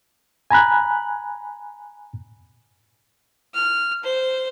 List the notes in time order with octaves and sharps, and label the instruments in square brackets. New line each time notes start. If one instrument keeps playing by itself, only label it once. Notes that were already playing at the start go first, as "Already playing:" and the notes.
[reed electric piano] G#5 A#5 B5 F#6
[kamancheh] F6
C5